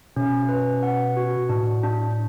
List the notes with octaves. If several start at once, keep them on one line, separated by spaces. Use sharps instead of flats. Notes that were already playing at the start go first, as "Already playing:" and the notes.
B2 C#4
B4
F#5
F#4
A2 D4
D4